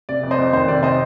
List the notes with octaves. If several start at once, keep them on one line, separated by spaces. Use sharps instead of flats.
C3 D5
F2
C5 D#5
F2
D#3 C5
C3 D5
C5 D#5